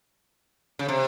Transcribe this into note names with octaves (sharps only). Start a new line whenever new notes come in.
C#3
C3